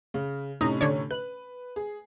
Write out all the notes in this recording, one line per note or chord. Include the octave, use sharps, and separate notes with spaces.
C#3
A2 C3 C#4 D#4
D3 D4 C#5
B4 F#6
G#4